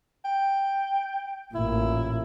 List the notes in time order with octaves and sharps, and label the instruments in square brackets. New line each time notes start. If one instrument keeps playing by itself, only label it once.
[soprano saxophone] G5
[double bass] A1 A#2 [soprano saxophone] E4